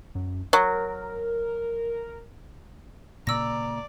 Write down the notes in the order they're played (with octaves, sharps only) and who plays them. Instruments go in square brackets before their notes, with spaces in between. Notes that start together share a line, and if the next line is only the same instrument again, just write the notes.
[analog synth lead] F#2
[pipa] F#3 [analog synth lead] A#4
[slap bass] A#2 C#3 A#3 [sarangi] D5 [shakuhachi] A#5 [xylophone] E6 A#6